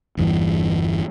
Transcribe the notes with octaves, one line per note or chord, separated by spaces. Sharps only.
G1 E2 G2 E3